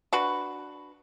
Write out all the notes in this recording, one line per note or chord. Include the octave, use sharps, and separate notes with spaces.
D4 F#4 B4